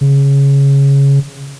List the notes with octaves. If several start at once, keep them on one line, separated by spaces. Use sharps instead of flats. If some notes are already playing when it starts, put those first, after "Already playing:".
C#3